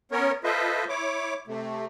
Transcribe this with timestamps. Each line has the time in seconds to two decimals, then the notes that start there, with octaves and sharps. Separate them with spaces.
0.12 B3 C#4 A#4 C#5
0.44 F4 A4 B4 C5 D#5 E5
0.89 E4 C#5 D6
1.47 C3 A3